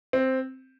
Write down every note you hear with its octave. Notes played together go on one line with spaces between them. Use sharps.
C4